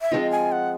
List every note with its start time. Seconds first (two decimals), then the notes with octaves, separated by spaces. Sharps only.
0.01 E5
0.12 F3 G#3 C4 F4 D#5
0.31 G#5
0.52 F#5